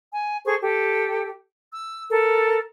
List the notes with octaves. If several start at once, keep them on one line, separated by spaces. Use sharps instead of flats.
G#5
G#4 A4 C5 C#6
G4 A4
E6
A4 A#4